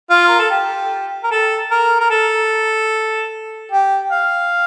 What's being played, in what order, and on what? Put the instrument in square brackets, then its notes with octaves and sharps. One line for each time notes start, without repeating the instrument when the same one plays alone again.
[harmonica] F4
A#4
A4
G4
A#4
A4
A#4
A#4
A4
G4
F5